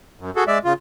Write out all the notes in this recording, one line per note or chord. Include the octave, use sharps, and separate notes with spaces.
F#2
F#4 G#4 A4
G#3 D5 E5
C#3 F4